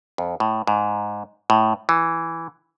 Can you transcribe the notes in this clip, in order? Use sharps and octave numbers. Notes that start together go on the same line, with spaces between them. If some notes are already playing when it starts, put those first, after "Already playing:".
F2
A2
G#2
A2
E3